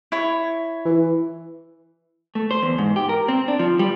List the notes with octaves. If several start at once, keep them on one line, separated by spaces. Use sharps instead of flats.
E4 C#5
E3
A3
C5
E2
G#2
G4
A#4
C4
D4
F3
G3